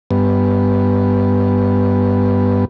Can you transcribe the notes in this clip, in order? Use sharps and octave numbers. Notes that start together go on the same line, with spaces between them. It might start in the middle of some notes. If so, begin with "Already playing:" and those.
G2 B3